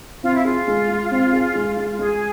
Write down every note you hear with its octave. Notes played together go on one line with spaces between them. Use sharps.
C4 F4
E4
F4 G#4
G#3
G#3
C4
G#4
G#3
G#3
G#3 G#4